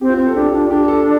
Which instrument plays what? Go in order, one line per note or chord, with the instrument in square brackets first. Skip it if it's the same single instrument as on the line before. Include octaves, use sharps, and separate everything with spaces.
[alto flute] C4 [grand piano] G4
[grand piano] F4
[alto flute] C4
[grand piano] A4
[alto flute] D4 [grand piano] G4
[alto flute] D4 [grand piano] F4
[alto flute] D4 [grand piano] G4
[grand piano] A4